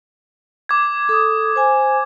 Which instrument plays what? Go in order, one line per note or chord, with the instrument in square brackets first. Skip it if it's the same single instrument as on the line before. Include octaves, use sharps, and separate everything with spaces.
[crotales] D6 G#6
[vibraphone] A4 D#6
C5 G#5